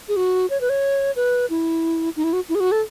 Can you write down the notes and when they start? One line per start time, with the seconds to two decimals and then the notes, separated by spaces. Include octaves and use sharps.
0.08 G#4
0.16 F#4
0.50 C#5
0.61 B4
0.69 C#5
1.16 B4
1.50 E4
2.16 D#4
2.24 E4
2.33 F#4
2.49 E4
2.55 G#4
2.60 F#4
2.72 A4